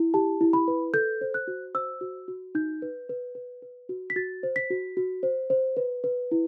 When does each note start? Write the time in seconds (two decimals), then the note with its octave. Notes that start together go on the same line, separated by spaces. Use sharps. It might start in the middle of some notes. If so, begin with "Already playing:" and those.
Already playing: E4
0.14 G4 A5
0.41 E4
0.53 B5
0.68 B4
0.94 A4 G6
1.21 C5
1.34 F#6
1.48 F#4
1.74 C5 E6
2.01 F#4
2.28 F#4
2.55 D#4 G6
2.82 B4
3.09 B4
3.35 B4
3.62 B4
3.89 F#4
4.10 B6
4.16 F#4 A6
4.43 C5
4.56 B6
4.70 F#4
4.97 F#4
5.23 C5
5.50 C5
5.77 B4
6.04 B4
6.32 E4